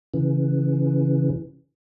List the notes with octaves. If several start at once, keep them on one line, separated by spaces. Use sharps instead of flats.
C#3 E3